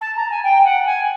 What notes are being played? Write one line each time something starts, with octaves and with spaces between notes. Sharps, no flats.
A5
A#5
G#5
G5
F#5
G#5